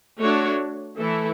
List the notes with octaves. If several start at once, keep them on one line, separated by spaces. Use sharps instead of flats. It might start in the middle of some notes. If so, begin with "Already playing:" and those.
A3 D4 F#4 C#5
E3 A3 E4 A4